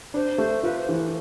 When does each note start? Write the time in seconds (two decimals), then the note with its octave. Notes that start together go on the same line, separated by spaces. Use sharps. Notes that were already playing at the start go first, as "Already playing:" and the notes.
0.14 D4 C5
0.38 A3
0.63 F4 B4
0.80 C5
0.89 E3